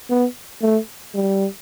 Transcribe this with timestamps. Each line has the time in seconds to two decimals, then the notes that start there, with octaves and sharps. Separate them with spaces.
0.10 B3
0.62 A3
1.15 G3